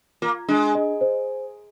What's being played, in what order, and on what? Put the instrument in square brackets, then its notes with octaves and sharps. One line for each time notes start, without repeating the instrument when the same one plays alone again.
[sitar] A#3 [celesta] F4
[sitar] G#3 [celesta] D4
[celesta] D#5
C5